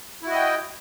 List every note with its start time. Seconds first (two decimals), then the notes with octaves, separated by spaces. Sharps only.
0.22 E4
0.27 F#4
0.31 D#5
0.35 G5